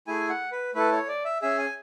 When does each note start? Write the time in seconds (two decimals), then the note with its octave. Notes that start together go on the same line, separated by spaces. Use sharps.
0.07 A3 E4 G#4 G#5
0.30 F#5
0.52 B4
0.75 A3 E4 A4 B4
0.92 C#5
1.08 D5
1.25 E5
1.42 C#4 G#4 E5
1.59 G#5